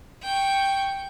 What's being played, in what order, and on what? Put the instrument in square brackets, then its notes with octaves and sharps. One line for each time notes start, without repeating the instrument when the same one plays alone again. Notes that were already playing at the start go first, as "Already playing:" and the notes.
[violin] G5 C#6